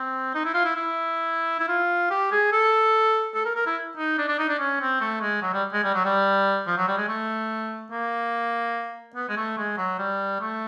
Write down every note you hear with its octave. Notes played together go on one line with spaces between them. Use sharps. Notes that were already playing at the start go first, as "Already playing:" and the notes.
Already playing: C4
D#4
E4
F4
E4
E4
E4
F4
G4
G#4
A4
A4
A#4
A#4
E4
D#4
D4
D4
D#4
D4
C#4
C4
A3
G#3
F#3
G3
G#3
G3
F#3
G3
F3
F#3
G3
G#3
A3
A#3
B3
G#3
A3
G#3
F#3
G3
A3